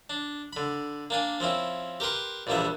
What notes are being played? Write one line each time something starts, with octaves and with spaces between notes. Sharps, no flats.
D4
D3 B5
A#3 D4 G#5
F3 C4 C#4 E4
G4 A#4 B4 C6
A#1 E2 A#2 G3 B3 E5